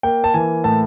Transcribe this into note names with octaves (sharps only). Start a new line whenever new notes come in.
A#3 G5
A5
E3 G#5
A2 A5